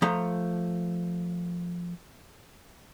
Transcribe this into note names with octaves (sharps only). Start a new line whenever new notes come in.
F3 A3 A#5